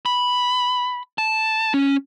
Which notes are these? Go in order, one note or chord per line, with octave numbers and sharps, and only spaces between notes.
B5
A5
C#4